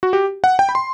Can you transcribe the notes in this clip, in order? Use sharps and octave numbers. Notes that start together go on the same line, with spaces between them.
F#4
G4
F#5
G5
B5
C6